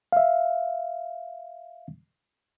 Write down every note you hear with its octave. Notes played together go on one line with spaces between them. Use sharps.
E5 F5